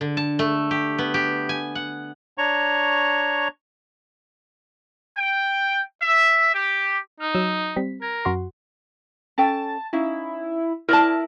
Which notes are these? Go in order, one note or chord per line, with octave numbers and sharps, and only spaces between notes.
D3
A5
A3
G4
B3
G4
G#5
F#5
D4 C#5 A#5 C#6
G5
E5
G4
D#4 F6
F#3 E6 E7
G3 C4 B6
A#4 G#6
F#2 F#4 C6
C#4 A4 G5 A5
C#4 D#4 E4 F5
E4 A#4 C5 D5 A5